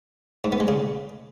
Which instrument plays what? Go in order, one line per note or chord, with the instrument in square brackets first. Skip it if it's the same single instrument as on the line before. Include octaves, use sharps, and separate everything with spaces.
[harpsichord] G#2
B3
G#3
C#3